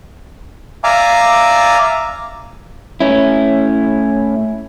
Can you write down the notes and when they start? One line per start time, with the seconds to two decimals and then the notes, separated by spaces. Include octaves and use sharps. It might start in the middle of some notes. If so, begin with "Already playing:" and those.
0.84 D5 E5 F5 G#5 A#5 D6
3.01 A2 C#4 E4